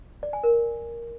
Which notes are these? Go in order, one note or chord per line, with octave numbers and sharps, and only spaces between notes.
D5
G#5
A#4